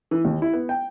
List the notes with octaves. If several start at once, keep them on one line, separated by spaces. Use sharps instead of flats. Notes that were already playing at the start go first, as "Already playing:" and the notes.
E3
D#2
E4
B3
G5